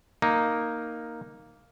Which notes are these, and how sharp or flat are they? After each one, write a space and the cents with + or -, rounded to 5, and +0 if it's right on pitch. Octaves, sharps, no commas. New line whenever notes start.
A#3 +0 D#4 +0